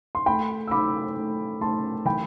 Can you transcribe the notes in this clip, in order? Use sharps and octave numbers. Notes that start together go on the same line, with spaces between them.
C6
A3 G5 B5
E6
A3 B5 D6
A3
A3 A5 C6
E3 G5 B5